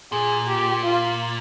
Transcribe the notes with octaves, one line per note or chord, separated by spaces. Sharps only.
A#2 G#4
G4
F4